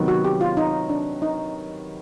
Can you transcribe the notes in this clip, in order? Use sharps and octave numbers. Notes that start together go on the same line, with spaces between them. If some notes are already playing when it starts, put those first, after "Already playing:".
Already playing: C3 D#3 F#3 B3
F#4
G4
F4
D#4
D4
D#4